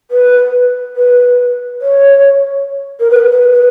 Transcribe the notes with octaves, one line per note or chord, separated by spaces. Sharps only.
B4
B4
C#5
A#4
B4
B4
B4